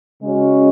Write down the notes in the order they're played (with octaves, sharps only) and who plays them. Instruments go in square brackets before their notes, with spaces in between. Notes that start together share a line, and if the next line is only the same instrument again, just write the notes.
[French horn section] C#3 G#3 C#4 F#4